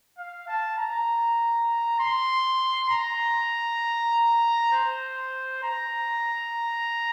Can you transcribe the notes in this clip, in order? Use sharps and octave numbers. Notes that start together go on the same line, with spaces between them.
F5
A5
A#5
C6
A#5
C5
A#5